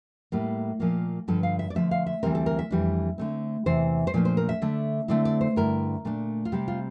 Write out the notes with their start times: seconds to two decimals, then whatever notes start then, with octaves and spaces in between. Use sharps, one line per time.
0.32 A2 G3 A#3
0.80 A#2 F3 A#3
1.28 G2 D3 F3 A4
1.43 F5
1.59 E5
1.70 D5
1.75 D3 F3 A3 E5
1.91 F5
2.07 E5
2.23 D2 C3 E3 G3 C4 A#4
2.35 A4
2.46 A#4
2.59 E5
2.71 F2 E3 G3 D4
3.18 D3 A3 C4
3.66 E2 C3 E3 C5
4.07 C5
4.14 A#2 F3 A3 D4 D5
4.25 C5
4.37 A#4
4.49 E5
4.62 D3 A3 D4
5.08 D3 A3 C4 E4 D5
5.25 D5
5.41 C5
5.56 G2 D3 A3 E4 A#4
6.05 A#2 A3 D4
6.45 F4
6.52 C3 G3 C4 G4
6.68 F4